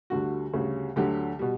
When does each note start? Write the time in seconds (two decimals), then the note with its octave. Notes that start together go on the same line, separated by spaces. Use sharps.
0.10 D2 D3 G3 F#4
0.53 D2 C#3 G3
0.96 D2 D3 F#3 G4
1.39 B2 G3